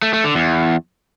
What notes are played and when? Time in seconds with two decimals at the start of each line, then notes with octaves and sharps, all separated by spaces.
0.02 A3
0.13 A3
0.24 D3
0.35 E2